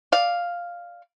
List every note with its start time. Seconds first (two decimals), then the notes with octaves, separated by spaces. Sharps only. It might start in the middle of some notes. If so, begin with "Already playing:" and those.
0.12 D5 F5